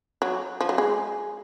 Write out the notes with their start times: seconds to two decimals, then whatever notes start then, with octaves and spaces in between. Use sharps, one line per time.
0.22 F#3
0.61 F3
0.69 F#3
0.78 G#3